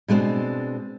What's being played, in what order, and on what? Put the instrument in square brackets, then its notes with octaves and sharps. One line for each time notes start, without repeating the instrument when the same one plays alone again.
[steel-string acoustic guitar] B2 G#3 A3 C4 D4